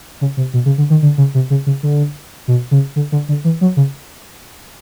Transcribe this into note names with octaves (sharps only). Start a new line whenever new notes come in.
C#3
C3
B2
C#3
D3
D#3
D3
C#3
C3
C#3
C#3
D3
B2
C#3
D3
D3
D3
E3
F#3
C#3